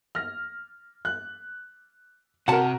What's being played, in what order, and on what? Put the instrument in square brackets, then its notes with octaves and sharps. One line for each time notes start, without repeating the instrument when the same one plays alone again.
[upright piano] F6 A#6
F#6
[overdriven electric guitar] C3 [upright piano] F#4 A#4 [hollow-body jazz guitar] F#5 A5